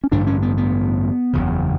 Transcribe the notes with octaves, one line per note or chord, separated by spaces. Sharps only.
C#4
A1 G2 D3 D4
C#4
B3
B3
F#1 E2 C#3